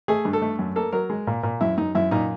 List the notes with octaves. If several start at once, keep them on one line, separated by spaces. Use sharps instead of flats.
A3 G#4
G2
A4
A3
F#2
A#3 A4
F#3 A#4
G#3
A#2
A#2
F#2 E4
F#2 D#4
F#2 E4
A#2 D#4